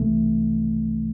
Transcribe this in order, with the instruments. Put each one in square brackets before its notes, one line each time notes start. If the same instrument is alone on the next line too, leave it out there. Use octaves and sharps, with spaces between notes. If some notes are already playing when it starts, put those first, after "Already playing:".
Already playing: [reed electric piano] C2 C3 E3 A3